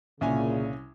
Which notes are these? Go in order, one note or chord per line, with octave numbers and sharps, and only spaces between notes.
C2 A#2 C#3 C#4 G#5